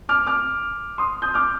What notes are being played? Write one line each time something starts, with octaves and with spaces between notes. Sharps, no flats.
D6 F6
D6 F6
C6 D#6
D#6 G6
D6 F6